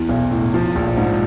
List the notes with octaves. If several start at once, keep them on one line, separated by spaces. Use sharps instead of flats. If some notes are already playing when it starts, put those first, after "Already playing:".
Already playing: E2 E3
B1
A2
F3
A#1
G#2